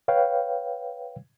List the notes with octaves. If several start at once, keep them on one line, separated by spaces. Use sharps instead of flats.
B4 C#5 F5 G5